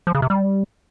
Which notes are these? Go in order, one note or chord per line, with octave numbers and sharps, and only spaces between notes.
F3
C#3
C3
G3